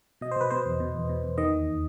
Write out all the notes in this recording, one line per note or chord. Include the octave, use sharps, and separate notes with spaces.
B2 D#5
C5
B2 B4
B2 C5
E2
B2
E2
B2
E2
D#3 D#5
D#2